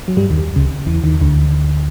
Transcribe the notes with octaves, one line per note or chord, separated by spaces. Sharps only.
F#3
G2 G3
D#2 D#3
C#2 C#3
E2 E3
D#2 D#3
D2 D3